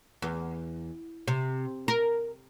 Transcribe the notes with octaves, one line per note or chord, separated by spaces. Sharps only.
E2
C3
A#4